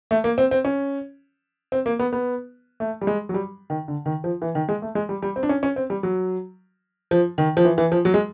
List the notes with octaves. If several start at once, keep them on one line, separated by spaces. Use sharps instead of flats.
A3
A#3
C4
C4
C#4
C4
A#3
B3
B3
A3
G3
G#3
F#3
G3
D#3
D3
D#3
F3
E3
D#3
G#3
A3
G#3
G3
G3
C4
D4
C#4
C#4
C4
G3
F#3
F3
D#3
F3
E3
E3
F3
F#3
G#3